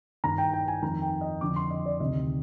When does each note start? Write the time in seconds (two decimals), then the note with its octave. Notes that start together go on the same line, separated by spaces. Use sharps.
0.24 G2 D#3 A#5
0.38 G5
0.54 G5
0.68 G#5
0.82 F2 D#3 A#5
1.02 G5
1.21 D#5
1.41 F2 D3 D6
1.56 C6
1.71 D#5
1.86 D5
2.00 D2 C3 D#3 D#5